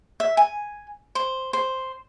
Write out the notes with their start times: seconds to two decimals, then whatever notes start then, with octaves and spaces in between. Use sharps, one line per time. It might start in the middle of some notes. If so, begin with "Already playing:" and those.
0.20 E5
0.37 G#5
1.15 C5
1.53 C5